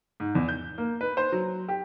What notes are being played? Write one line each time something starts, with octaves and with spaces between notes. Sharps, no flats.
G#2
E2
G6
A#3
B4
C5
F#3
G4